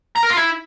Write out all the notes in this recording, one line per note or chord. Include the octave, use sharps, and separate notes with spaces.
A#5
A#4
F4
E4